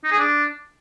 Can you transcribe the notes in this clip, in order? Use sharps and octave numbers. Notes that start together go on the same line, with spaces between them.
D#4
G#4
D4